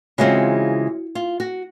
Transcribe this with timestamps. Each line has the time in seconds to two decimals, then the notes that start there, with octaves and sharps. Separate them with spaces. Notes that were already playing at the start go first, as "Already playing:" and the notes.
0.18 C#3 E3 G#3 C4 F4 F#4
1.15 F4
1.40 F#4